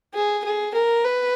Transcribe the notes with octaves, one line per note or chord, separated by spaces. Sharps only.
G#4
G#4
A#4
B4